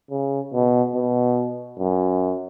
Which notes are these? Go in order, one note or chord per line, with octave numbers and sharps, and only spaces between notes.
C#3
B2
B2
F#2